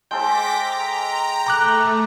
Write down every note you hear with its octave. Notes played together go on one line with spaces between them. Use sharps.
G#3 A4 C5 G5 D6 A#6 B6
A#5
A3 A#5 D6 F#6